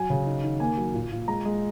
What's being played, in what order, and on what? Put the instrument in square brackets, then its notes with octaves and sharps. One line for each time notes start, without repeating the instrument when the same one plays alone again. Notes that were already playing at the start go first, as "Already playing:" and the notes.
Already playing: [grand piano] F#3 G#5
C#3
D#4
D#3
A#3 G#5
F#3
A#2
A#2
G#3 A#5
G#3